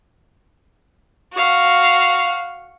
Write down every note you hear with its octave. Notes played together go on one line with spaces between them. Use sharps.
F#4 F5